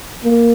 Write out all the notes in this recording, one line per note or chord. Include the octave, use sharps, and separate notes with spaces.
A#3